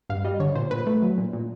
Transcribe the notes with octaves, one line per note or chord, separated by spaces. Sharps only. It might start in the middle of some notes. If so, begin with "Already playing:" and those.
G2 F5
G3 D#5
D3 C#5
A#2 C5
A#2 B4
A3
F#3
A#2
A#2